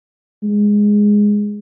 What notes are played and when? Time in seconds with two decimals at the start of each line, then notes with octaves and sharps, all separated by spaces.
0.43 G#3